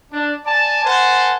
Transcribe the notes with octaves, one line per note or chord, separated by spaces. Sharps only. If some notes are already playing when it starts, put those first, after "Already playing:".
D4
D5 G#5 A5
A#4 C5 F#5 G#5 A5